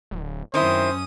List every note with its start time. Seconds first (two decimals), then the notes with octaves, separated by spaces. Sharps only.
0.11 D1
0.54 F#2 D#3 C4 C#4 E4 C5 D#6